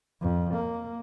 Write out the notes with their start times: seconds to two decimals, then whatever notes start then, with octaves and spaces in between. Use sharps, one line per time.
0.21 F2
0.54 A#3